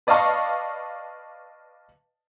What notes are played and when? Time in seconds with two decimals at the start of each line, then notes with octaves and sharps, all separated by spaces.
0.07 B4 D5 D#5 F5 A5 C#6